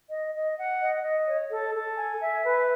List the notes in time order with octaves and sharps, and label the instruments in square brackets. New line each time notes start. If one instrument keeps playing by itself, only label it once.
[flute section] D#5
D#5
F#5
D#5
D#5
C#5
A4
A4
G#5
E5
B4